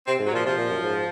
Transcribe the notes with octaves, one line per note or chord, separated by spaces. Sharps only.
C3 C4
G#2
F#3
A#2 F3
C3 F3
A#2
F#2
G#2